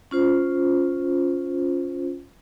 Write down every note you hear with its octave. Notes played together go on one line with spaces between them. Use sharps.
C#4 F4 C5